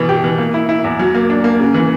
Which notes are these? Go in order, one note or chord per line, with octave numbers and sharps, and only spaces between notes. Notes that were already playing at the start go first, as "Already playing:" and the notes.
Already playing: B2 E3 B3
G4
E3
A#3
E4
E4
E2
F#3
A#3
D4
A#3
C#3
E3